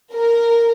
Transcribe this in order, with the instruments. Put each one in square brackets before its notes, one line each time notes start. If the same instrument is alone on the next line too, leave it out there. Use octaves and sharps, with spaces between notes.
[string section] A#4